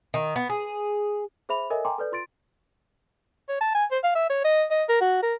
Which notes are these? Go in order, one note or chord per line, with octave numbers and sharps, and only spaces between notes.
D#3
B3
G#4
G#4 C5 E5 B5 F7
A4 A#4 C#5 D#5 E5 G#5
G5 G#5 A#5 C6 D6
A4 B4 D5
F4 C6 A6 D7
C#5
A5
G#5
C5
F5
E5
C#5
D#5
D#5
A#4
F#4
A#4